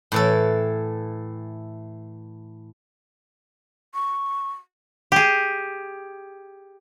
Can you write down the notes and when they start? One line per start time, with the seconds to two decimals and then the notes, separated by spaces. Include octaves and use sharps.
0.12 A2 E3 A4
3.94 C#6
5.12 G4 G#4